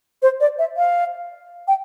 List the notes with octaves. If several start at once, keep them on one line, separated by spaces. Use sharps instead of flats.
C5
D5
E5
F5
G5